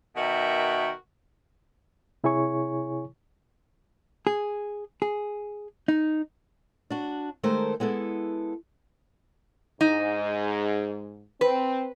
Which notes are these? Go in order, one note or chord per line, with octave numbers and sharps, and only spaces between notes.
B2 D#3 F#4 A#4 E5 G5
C3 E4 G#4 C#5 G#5 C#6
G#4
G#4
D#4
D4 F#4
D#3 G#3 A3 A4 A#4 C5
G#3 B3 E4 A4
G#2 D#4
C4 B4